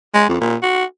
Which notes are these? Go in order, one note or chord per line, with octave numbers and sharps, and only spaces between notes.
G#3
F2
A#2
F#4